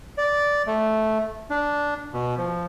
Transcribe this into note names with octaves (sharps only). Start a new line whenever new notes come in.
D5
A3
D4
B2
F3